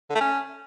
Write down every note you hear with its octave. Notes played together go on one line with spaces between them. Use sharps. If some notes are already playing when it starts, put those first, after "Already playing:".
D3
A3
C#4